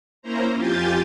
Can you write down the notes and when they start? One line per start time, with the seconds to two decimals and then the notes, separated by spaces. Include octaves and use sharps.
0.22 A#3 C#4 E4 C5 A#5
0.55 F2 F4 G4 G#5 G6 A6